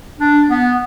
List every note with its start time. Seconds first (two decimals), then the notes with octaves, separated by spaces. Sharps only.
0.19 D4
0.50 B3